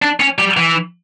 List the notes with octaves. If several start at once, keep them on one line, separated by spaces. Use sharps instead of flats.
D4
C#4
G3
E3